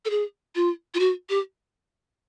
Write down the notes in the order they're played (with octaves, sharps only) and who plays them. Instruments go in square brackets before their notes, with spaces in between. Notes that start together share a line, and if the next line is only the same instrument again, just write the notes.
[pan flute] A4
G#4
F4
F4
F#4
G4